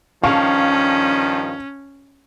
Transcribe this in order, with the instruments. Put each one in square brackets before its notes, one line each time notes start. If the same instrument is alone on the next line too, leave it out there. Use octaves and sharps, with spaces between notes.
[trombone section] G2 D#3 F3 [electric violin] C#4 [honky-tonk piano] F5 A5 C#6